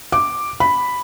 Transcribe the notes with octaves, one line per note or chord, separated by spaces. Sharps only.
D6
B5